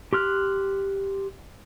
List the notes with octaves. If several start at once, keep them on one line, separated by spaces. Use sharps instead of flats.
G4 C6 F6 F#6